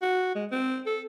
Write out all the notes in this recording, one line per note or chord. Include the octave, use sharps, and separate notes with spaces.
F#4
G#3
C4
A4